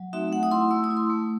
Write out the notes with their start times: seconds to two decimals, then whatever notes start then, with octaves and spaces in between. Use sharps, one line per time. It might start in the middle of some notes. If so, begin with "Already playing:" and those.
Already playing: F#3
0.13 A3 C4 D#4 F#4 E5
0.32 A3 F#5
0.43 D#6
0.51 E4 C6
0.71 A3 E6
0.84 D#6
0.91 E4
0.97 C6
1.10 A3